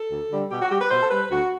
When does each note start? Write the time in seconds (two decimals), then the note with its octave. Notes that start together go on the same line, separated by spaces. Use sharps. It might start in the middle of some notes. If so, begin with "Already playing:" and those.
Already playing: A4
0.10 D2
0.30 D3 G3
0.51 B2 G4
0.62 F#4
0.71 G3 G4
0.81 B4
0.91 B2 C5
1.03 A4
1.11 G3 B4
1.31 D2 F#4